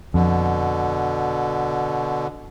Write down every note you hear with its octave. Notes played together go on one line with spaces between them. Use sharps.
F2 B2 D3